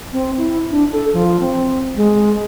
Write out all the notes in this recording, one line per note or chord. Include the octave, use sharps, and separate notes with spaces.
C4
E4
D4
A4
F3
C4
G#3